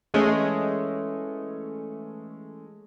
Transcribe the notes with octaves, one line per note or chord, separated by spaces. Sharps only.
E3 G#3 A3 C#4